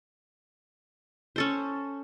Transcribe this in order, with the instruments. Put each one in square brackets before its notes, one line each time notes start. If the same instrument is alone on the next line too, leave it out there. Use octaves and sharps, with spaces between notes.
[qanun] C#4 A4 C5